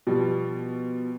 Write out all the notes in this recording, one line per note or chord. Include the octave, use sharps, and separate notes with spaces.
B2 F3 G3